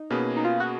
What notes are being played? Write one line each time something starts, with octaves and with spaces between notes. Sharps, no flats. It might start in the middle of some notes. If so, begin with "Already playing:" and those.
Already playing: D#4
B2 A#3 C#4 G#4 B4
D#4
F4
F#4